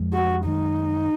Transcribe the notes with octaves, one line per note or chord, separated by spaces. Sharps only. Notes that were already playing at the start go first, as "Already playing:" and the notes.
Already playing: F2 F3 G#3
F#4
F#2 D#3 G#3 D#4